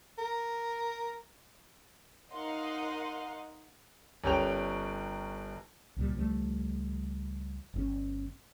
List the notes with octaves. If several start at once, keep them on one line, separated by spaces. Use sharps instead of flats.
A#4
D#4 A#4 D#5 F5 F#5 C6
G1 C#4 G4 A#4 G5 F7
C#2 A#2 G3
C#2 F3 G3 A3
G1 C#3 C#4